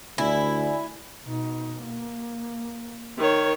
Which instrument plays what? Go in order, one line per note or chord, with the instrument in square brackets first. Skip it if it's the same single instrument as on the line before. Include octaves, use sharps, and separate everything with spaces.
[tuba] D2 [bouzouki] E4 [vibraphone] D5 G#5
[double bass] B2 D#4
A#3
[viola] D#3 C#5